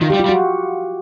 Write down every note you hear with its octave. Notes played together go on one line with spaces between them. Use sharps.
D#3 F4
G3 G4
F4
G3
F#4